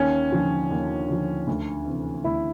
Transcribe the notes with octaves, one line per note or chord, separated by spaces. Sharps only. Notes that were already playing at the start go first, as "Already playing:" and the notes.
Already playing: D#2 C#4
D3 F3
D#2
D3 F3
D2
C3 E3
D2 E4